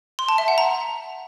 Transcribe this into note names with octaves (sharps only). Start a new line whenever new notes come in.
C6
A5
E5
F#5
A#5